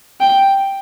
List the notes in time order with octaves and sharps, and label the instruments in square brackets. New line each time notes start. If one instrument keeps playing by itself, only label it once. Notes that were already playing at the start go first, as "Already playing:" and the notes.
[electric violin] G5